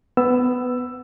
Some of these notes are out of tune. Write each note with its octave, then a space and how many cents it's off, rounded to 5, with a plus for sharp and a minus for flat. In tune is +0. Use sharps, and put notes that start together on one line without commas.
B3 +15 E6 +10